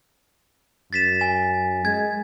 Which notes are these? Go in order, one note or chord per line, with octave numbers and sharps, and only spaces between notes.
F#2 A6 B6 E7
G#5
G#3 G#6